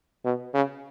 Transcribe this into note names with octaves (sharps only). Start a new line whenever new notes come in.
B2
C#3